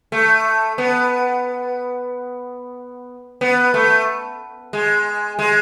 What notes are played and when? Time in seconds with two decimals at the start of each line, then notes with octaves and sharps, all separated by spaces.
0.12 A3
0.78 B3
3.41 B3
3.74 A3
4.73 G#3
5.39 G#3